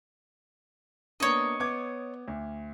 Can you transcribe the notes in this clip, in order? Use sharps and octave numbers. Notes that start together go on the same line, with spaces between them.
A#3 B3 D4 C#5 D#5
B3 D6 G#6
D2